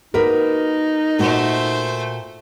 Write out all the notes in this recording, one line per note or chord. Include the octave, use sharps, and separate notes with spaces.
A#3 D#4 F#4 A#4 B4
A#2 A3 A#3 F#4 C5